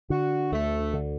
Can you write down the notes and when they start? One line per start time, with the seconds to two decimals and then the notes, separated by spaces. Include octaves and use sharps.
0.10 D3 F#4
0.52 D2 A3
0.93 D3